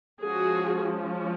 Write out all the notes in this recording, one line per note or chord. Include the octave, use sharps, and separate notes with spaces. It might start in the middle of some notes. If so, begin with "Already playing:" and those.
F3 G#3 C#4 F#4 G#4